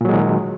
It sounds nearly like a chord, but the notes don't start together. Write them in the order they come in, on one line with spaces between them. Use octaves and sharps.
A#2 F#3 G#3 D#3